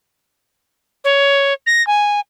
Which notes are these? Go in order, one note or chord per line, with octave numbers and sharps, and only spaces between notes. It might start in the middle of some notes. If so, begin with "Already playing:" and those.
C#5
A#6
G#5